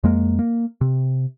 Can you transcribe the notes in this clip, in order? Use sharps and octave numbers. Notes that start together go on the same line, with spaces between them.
F2 G#3 A#3
A#3
C3